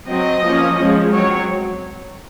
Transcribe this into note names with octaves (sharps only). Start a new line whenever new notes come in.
F#3 C4 D#5
F3 A#3 C#4
F3 G#3 C#4
F#3 C4 C#5